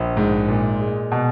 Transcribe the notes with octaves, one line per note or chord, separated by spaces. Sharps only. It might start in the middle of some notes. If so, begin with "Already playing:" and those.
Already playing: A#1
G#2
A#2
G#3
B2